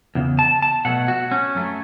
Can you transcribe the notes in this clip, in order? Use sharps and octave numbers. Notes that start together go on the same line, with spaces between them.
E2 C#3
A5
A5
B2 F#3 A3 F#5
F#4
C#4
F#2 F#3 A3